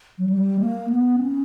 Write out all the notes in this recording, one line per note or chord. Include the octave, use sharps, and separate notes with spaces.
F#3
G3
A#3
B3
C#4